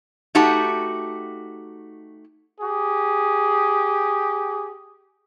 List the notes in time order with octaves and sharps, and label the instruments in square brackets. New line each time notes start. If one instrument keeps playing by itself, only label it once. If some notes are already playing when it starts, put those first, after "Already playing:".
[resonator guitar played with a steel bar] A3 D#4 F#4 G4 A5
[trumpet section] G4 G#4